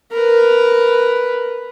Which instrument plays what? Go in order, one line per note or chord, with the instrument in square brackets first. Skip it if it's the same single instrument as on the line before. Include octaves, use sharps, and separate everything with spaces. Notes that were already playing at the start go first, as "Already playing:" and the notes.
[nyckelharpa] A#4 B4